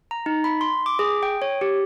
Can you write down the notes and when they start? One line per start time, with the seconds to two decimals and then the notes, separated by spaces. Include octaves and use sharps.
0.11 A#5
0.26 D#4
0.44 B5
0.61 C6
0.86 D6
0.99 G#4
1.23 G5
1.42 C#5
1.61 G4